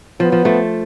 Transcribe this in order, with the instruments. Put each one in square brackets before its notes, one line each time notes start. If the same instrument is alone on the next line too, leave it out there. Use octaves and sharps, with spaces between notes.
[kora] F3 [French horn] B3
[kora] F3
F3 A3